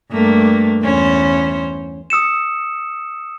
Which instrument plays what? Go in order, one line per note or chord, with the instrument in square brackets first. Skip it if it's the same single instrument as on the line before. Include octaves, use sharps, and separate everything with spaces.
[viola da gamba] G2 A3 A#3
E2 C#4 C5
[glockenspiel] D#6 E6 C#7 E7